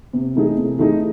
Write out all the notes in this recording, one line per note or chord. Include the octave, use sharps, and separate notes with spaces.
C3
E3 A3 D#4 G#4
C3
E3 A3 D#4 G#4